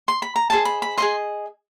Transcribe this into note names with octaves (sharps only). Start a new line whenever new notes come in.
C6
B5
A#5
G#4 C5 D#5 A5
B5
B5
G#4 C5 D#5 C6